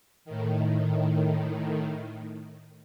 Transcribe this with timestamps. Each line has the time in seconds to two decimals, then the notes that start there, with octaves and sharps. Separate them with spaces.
0.25 A2 D#3